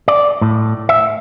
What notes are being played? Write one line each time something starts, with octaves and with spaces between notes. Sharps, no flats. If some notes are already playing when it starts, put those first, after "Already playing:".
D5
A2
E5